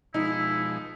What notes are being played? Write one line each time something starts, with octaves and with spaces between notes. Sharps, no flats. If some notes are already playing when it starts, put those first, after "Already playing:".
B2 F3 G#3 D#4 E4